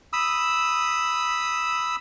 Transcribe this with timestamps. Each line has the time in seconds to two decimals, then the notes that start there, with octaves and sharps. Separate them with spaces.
0.13 B5 D#6 E6